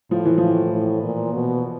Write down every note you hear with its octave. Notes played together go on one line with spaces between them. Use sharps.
A2 F3
E3
A2 F3
A2
A#2
B2